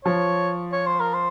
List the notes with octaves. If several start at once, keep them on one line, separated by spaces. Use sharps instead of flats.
F3 C#5
C#5
C5
A#4
C5